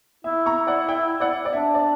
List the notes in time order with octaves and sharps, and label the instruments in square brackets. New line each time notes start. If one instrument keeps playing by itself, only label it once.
[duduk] E4 [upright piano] E5
[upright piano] A#5 C#6
D5 F#5
E5 G5
D5 F#5
D5
[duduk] D4 [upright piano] E5
[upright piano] D5